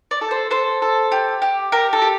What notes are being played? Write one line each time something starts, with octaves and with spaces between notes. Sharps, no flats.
D5
A4
C5
A4 C5
A4
G4
G4
G4 A#4
A4
G4